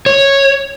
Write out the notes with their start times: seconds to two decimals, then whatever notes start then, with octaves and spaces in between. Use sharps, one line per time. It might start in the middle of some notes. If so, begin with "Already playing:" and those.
0.06 C#5